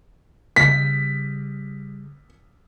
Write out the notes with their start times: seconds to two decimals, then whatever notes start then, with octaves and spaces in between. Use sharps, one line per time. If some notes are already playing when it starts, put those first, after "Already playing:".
0.56 C#3 G3 B6